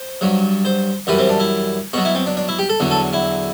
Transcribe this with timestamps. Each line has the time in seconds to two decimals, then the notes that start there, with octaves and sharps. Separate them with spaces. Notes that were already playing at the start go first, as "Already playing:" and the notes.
Already playing: C5
0.21 G2 F#3
0.65 C5
1.07 F#2 E3 G3 B4
1.19 C4
1.29 D4
1.40 E4
1.93 B2 F#3 F#4
2.04 E4
2.15 C4
2.26 D4
2.37 D4
2.48 E4
2.59 G4
2.69 A4
2.80 E2 D3 F#3
2.91 A4
3.13 E4